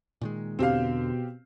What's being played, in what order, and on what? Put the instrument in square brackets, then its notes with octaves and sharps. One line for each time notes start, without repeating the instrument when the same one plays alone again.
[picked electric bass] A#2 D#3 G#3
[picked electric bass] E2 D3 [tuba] B2 [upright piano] C4 G4 F5